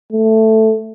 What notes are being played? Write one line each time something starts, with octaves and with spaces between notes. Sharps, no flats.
A3